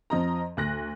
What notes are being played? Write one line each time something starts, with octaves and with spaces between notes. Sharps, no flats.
F2 F3 D#5 A#5
D2 F#6 A#6